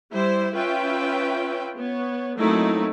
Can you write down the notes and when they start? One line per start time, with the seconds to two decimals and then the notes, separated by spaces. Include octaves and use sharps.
0.12 G3 E4 C5
0.53 C#4 F4 B4 E5 G5
1.75 B3 C#5
2.36 F#3 A3 A#3 C4 D#4 E4